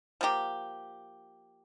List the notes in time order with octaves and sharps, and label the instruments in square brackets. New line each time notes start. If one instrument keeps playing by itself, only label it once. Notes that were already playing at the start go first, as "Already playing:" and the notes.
[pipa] F3 A#3 G4